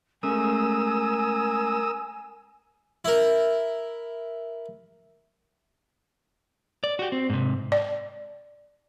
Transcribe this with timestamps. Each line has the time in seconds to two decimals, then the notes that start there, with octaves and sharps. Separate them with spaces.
0.23 G#3 A3 C#4 A#4 G#5 D#6 E6
3.05 E4 A#4
6.84 D5
6.99 F#4 G4
7.12 C4
7.30 G#2 C3
7.72 D5